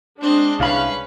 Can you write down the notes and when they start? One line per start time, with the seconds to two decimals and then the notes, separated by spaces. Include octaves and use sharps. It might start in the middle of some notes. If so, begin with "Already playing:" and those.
0.21 G#3 C4 D4 D#5
0.60 C2 C#4 B4 F5 B5